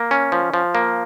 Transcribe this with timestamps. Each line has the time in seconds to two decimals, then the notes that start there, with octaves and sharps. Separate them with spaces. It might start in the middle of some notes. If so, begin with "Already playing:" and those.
Already playing: A#3
0.11 C#4
0.32 F3
0.54 F3
0.75 A#3